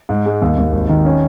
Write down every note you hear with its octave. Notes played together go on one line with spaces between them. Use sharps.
G#2
G#3
D#2
D#2
G#1
D#3
C#4